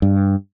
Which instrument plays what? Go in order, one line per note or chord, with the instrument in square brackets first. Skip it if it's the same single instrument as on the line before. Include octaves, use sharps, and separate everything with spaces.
[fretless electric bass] G2